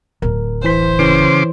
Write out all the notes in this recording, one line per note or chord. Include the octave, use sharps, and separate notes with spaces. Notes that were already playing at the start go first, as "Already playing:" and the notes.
D1 D4 A#4
A1 E3 C5 B6
C#3 E3 C#5 C6 D6